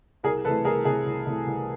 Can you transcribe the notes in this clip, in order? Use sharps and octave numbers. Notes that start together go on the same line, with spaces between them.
C2 G#4 A#4
C3 E3 A3 A4 B4
C2 G#4 A#4
C3 E3 A3 G#4
C2
C3 E3 A3
C2